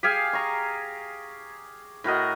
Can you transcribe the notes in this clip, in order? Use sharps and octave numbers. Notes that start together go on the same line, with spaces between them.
G4 G#4 F5 G#5
A#5 C#6
A2 F#4 A#4 D#5